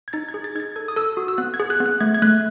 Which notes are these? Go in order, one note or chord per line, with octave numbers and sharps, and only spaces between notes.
G#6
D#4 A6
G#6
G#4
A6
D#4 G#6 A6
A4 G#6
D#6
A4 E6
F#4 D#6
E6
B3 F#6
G#6
G#4
F#6
B3
F#6
A3 G#6
G#6
A3 F#6